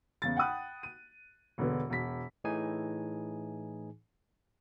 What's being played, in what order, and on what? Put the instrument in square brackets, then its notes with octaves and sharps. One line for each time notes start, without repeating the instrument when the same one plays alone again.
[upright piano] E2 C#3 A6
F#5 G5 B5 D#6 F#6
D#7
E1 D3 B3
E1 B6
[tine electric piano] A2 E3 D#4 G#4 G#5